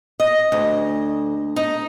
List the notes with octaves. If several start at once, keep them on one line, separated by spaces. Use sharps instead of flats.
D#5
D2
D#4